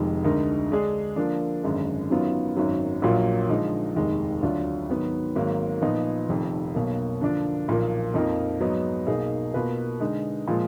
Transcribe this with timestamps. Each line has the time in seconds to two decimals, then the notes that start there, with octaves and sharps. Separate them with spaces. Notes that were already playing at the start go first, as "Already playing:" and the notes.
Already playing: F1 F2 D#3 G#3
0.24 D2 D3 G#3 D#4 A#4
0.71 D3 G#3 D4 G#4
1.16 D3 F3 A#3 D4
1.63 G#1 F#2 D3 G#3
2.10 F#2 D#3 F#3 B3 F4
2.56 G#1 F#2 D#3 F#3
3.02 A#1 A#2 F#3 A#3 F4
3.49 D3 F3 G#3 D#4
3.95 F1 D#2 D#3 G#3
4.42 D2 D3 F#3 D4 F4
4.89 G#2 D#3 F#3 B3
5.35 G#1 G#2 F#3 A#3
5.81 A#2 F3 B3 D#4
6.29 F1 F2 D#3
6.75 B1 B2 F#3 A#3
7.21 D3 F3 A#3 D4
7.68 B1 A#2 F3 A#3
8.14 F2 F3 A#3 D#4 A#4
8.60 G#2 F#3 B3 D#4
9.07 B1 B2 A#3 D#4 G#4
9.54 B2 A#3 F4 B4
10.00 D3 G#3 D#4
10.48 A#2 F3 G#3